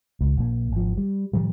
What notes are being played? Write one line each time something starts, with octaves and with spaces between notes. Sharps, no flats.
C#2
A#1 A#3
G#1 F3
G3
A2 D#3 F3 G3